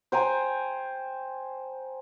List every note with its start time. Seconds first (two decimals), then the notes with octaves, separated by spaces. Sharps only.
0.12 C5 G5 G#5 A#5